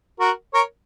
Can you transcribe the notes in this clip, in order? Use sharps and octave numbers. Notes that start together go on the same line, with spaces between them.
F#4 A#4
A#4 C#5